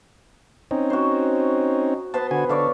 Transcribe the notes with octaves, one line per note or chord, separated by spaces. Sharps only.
C4 C#4 D#4
F#4 C5
B3 B4 C5 A5
D3 F#4 G#5
D3 A4 C#5 D5 F5